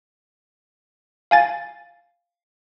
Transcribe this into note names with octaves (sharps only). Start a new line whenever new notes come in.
F5 G#5 A6